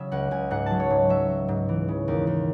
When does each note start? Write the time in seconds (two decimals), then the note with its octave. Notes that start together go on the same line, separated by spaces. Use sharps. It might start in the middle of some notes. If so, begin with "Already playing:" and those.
Already playing: C#3 F#3 E5
0.12 C#2 F#5
0.31 C#2 G#5
0.51 G#2 F#5
0.66 F#3 A5
0.80 C#5
0.90 G#2
1.09 F#3 E5
1.29 F#3
1.48 G#2
1.69 E3
1.88 C#3
2.08 D#2
2.27 D#2